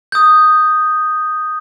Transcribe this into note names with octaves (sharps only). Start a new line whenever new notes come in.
D#6 G6